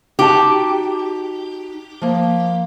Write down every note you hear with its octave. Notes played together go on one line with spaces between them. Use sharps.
D#4 F#4 G4 A5
F3 A#3